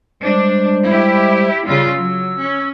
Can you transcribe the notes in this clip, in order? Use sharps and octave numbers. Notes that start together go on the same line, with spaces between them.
G3 G#3 D4 C5
E4 G4
C#3 G3 F4 E6
F#3
C#4